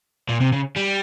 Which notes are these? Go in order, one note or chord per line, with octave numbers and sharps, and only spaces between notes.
A#2
C3
C#3
G3